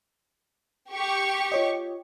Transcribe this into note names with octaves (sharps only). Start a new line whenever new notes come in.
G4 C#6
F4 C#5 D#5